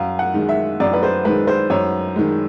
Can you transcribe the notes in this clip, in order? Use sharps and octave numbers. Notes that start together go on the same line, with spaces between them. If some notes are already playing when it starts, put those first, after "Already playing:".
Already playing: F#2 F5
F#5
D#3 G#3
E5
F#2 D5
B4
C5
D#3 G#3 B4
C5
F#2 C#5
D#3 G#3